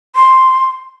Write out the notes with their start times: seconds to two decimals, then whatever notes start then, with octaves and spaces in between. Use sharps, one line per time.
0.15 C6